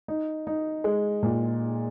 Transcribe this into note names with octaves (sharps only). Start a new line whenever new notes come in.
D#4
D#4
G#3
A#2